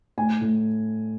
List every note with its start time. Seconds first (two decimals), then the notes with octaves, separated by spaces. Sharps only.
0.17 A2 G#5
0.41 A2